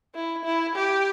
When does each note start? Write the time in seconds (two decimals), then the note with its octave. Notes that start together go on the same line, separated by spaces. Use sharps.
0.15 E4
0.45 E4
0.75 G4